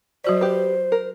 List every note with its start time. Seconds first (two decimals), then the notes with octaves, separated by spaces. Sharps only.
0.24 F#3 F#4 C5 D5
0.41 G4 B4
0.92 A#4